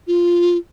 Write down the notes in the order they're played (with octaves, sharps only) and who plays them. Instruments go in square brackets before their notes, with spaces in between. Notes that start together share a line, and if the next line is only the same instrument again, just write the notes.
[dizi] F4